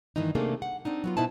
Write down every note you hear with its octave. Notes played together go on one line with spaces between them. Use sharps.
G2 D#3 E3 A#3 D#4
C3 A3 A#3 D4 D#4 G#4
F#5
C4 D4 D#4
F#3 B3 F4
B2 B3 D#4 E4 C5 A5